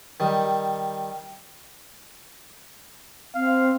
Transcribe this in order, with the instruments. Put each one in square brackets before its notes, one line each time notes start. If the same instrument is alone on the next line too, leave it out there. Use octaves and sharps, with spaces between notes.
[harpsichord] D#3 G3
[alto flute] C4 [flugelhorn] F5